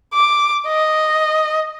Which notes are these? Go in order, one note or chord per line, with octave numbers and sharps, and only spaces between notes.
D6
D#5